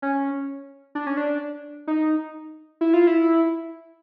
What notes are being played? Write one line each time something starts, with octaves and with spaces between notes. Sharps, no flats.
C#4
D4
C#4
D4
D#4
E4
F4
E4